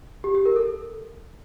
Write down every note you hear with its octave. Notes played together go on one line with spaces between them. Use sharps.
G4
G4
A#4
A4